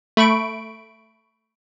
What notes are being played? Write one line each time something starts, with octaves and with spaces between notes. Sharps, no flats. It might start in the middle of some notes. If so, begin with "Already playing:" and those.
A3 B5 C#6 D7